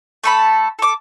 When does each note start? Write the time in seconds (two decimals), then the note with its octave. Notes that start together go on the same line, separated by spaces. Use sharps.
0.24 A3 A4 B5
0.79 A4 D6